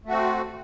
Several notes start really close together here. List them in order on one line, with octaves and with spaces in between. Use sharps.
A3 F#4 C4